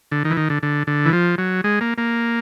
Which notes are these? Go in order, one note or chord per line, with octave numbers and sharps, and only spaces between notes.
D3
D#3
E3
D#3
D3
D3
D3
E3
F3
F#3
G#3
A#3
A#3